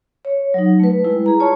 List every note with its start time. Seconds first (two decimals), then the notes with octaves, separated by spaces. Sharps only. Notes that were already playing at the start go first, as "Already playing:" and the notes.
0.25 C#5
0.54 F#3 D#4
0.80 A3 B4
1.04 G3 G#3 E4 B4
1.26 G#4 A#5
1.40 F4 C#5 D5 A5 C#6